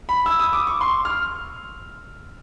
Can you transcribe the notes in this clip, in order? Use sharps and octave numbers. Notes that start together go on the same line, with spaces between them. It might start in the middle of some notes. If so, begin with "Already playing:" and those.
B5
E6
D#6
D6
C#6
C6
F6